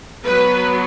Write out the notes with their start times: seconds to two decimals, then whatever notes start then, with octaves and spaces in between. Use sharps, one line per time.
0.25 F#3 B3 B4